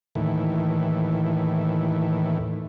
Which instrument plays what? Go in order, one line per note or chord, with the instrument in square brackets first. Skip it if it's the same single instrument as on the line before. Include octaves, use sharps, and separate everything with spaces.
[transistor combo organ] D#2 A2 E3